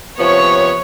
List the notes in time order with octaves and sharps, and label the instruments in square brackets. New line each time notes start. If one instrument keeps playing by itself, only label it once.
[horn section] C3 F3 B3 [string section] C#5